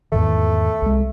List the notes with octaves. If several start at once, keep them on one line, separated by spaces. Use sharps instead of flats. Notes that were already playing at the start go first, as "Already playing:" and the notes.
E2 G#2 D#3 A3
C2 G#3